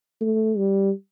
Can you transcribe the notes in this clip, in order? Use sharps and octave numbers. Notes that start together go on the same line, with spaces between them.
A3
G3